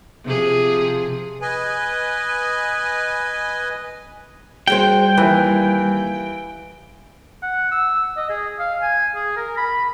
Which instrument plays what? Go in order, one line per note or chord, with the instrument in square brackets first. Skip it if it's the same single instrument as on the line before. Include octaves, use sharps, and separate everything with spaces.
[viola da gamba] C3 F3 G#4
[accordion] B4 D#5 G#5
[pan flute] G3 [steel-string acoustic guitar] F#4 G#4 C5 [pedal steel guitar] G5
[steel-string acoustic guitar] D#2 [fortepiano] E3
[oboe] F#5
E6
D#5
G#4
F5
G#5
G#4
A#4
B5